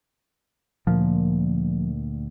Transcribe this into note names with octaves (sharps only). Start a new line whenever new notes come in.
D2 A#2 F3 A#3